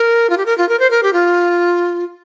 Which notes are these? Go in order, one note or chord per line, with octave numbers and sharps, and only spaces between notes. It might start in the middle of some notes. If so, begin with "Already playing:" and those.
Already playing: A#4
F4
G4
A#4
F4
A#4
C5
A#4
G4
F4